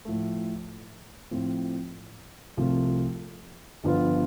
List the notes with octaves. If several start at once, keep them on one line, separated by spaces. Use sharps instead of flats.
A2 F3 A3
A2 F3 C4
C2 C3 F3 A3
G1 G2 F3 B3 F4